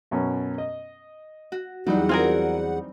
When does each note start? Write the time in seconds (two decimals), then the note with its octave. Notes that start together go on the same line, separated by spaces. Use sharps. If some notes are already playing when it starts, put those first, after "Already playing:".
0.11 F#2 B2 C#4
0.58 D#5
1.52 F#4
1.86 E2 E3 F#3 G3 D4 D#4 F#5
2.09 C4 F4 G#4 A#4